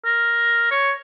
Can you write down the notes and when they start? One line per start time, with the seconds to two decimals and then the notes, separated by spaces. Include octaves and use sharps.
0.05 A#4
0.71 C#5